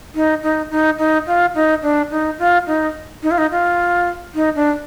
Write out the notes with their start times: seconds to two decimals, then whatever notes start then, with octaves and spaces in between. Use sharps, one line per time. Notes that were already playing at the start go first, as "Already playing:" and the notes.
0.15 D#4
0.43 D#4
0.71 D#4
0.98 D#4
1.27 F4
1.55 D#4
1.83 D4
2.11 D#4
2.39 F4
2.67 D#4
3.23 D#4
3.31 F4
3.38 D#4
3.51 F4
4.35 D#4
4.55 D4